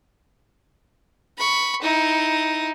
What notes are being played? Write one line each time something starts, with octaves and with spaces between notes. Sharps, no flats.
B5 C#6
D#4 E4